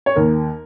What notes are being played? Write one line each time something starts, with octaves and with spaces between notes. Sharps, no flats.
C#5
D#2 A#4